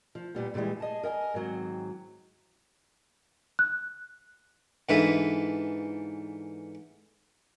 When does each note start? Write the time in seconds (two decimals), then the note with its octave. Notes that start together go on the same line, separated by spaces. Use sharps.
0.15 F3
0.34 A#2 G3 B3
0.54 A#2 D3 E3 G3 G#3
0.80 G#4 D#5 A5
1.03 A#4 D#5 G5 G#5
1.34 G#2 D#3 F#3 C4
3.59 F#6
4.89 G#2 D3 E3 E4 F4 B4